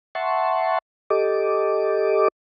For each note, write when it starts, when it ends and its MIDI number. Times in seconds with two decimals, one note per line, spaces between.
0.15 0.78 76
0.15 0.78 78
0.15 0.78 81
0.15 0.78 84
0.15 0.78 85
1.10 2.28 67
1.10 2.28 69
1.10 2.28 75
1.10 2.28 86